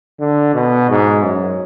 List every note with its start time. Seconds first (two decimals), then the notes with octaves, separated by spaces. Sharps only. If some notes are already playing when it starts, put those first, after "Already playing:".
0.20 D3
0.55 B2
0.90 G#2
1.23 F#2